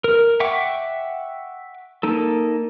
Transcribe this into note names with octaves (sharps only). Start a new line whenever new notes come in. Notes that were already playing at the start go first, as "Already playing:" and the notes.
A#4
E5 F#5 G5 C#6 D6
A#3 D#4 A4